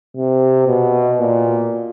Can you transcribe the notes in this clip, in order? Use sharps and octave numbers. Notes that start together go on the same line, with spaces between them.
C3
B2
A#2